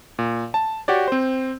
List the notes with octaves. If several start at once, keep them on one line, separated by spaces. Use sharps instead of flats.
A#2
A5
F#4 G4 C#5 D5
C4 C5